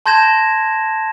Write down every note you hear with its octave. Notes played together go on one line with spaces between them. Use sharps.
A5 C6 G6 G#6 A#6 E7